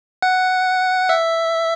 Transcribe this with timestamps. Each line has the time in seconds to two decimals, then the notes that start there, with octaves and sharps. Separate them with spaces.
0.22 F#5
1.09 E5